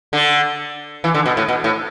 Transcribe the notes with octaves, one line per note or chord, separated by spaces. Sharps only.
D3
E3
D3
B2
A2
B2
A2